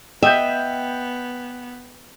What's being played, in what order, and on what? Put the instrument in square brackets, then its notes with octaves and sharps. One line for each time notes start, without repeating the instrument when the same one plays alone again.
[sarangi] B3 [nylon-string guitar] D#5 [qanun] E5 [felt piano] G5 G6